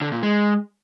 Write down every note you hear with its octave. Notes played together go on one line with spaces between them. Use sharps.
D3
A#2
G#3